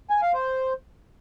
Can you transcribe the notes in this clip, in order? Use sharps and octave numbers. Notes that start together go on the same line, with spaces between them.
G#5
F5
C5